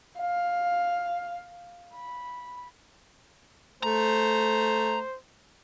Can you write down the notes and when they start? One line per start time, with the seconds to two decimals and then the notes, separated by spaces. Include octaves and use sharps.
0.20 F5
1.94 B5
3.83 A3 C5 A#5